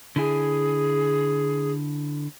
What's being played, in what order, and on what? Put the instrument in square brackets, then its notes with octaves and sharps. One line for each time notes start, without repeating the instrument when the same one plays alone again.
[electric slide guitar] D3 E4 G#5 [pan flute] G#4